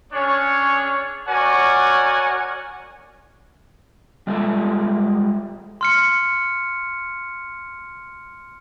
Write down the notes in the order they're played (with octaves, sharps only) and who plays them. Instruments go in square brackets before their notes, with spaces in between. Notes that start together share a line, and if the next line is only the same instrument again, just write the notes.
[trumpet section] C#4 D4 G#4 C#5
F#4 A#4 C#5 D5 F#5 G#5
[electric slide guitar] G3 G#3 F4 G4 A4 E5
[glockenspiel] C6 F6 C#7